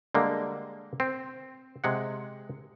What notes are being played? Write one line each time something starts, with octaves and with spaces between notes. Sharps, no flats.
D3 G3 G#3 A#3
C4
C3 G#3 F#5